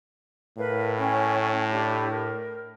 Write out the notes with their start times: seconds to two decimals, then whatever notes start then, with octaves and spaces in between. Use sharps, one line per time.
0.57 A2 A#4 B4 F5
0.99 C#4 G5 A#5
1.72 D4 E4 G4
2.10 A#4